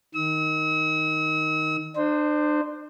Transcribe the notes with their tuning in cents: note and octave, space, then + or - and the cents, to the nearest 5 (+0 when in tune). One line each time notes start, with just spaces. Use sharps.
D#3 +0 E6 -45
D4 +35 C5 -10